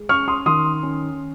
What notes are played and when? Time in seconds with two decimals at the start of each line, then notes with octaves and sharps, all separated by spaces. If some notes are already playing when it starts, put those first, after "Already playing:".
Already playing: G#3
0.09 C#4 C#6 F6
0.28 C6 D#6
0.46 D#3 C6 D#6
0.83 C#4